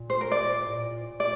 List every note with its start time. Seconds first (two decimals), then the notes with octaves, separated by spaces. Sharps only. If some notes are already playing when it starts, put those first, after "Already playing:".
Already playing: A#2
0.10 C5
0.21 A#4
0.32 D5
0.67 A2
0.75 A#2
1.20 D5